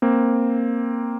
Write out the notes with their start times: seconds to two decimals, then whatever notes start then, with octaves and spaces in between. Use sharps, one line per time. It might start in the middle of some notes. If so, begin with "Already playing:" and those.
0.02 A#3 C4